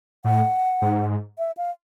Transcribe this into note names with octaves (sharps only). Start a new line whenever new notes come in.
A2 F#5
G#2
E5
F5